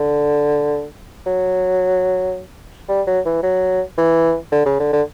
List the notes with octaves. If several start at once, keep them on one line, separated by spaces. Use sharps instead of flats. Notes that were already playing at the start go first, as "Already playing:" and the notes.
Already playing: D3
F#3
G3
F#3
E3
F#3
E3
D3
C#3
D3
D3